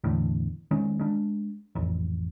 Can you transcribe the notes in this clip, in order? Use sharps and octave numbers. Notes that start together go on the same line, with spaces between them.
E2 A2 D3
D#3 G#3 C#4
G#3 D4
A1 F2